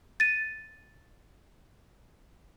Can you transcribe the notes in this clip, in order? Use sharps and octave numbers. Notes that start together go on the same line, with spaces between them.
A6 D#7